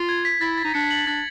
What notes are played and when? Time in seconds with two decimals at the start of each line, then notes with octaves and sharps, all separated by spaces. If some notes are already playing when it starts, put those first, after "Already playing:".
Already playing: F4
0.09 G#6
0.25 B6
0.41 E4 A6
0.58 A6
0.65 D#4
0.74 D4 C#7
0.91 F#7
1.07 D4 A6